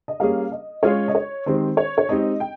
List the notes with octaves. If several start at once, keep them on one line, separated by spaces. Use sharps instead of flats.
D#5
G3 A#3 C#4 G#4 F5
D#5
G#3 C#4 F4 G#4 C#5
D#5
C#5
D#3 G#3 C4 G4 C5
C#5
C#5
G#3 C4 D#4 G4 D#5
G5